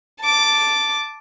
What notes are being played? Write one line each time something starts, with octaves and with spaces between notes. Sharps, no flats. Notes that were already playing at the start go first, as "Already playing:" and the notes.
A5 D6